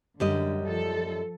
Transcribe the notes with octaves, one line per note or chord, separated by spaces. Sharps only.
F#2 D3 G3 D#5
F3 A4